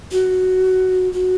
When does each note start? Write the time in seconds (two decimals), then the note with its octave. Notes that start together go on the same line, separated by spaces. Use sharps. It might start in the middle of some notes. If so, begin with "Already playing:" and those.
0.11 F#4
1.13 F#4